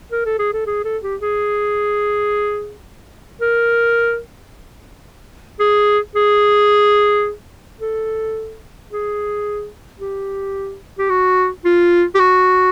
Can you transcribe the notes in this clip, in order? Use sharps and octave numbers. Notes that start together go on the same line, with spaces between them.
A#4
A4
G#4
A4
G#4
A4
G4
G#4
A#4
G#4
G#4
A4
G#4
G4
G4
F#4
F4
G4
F#4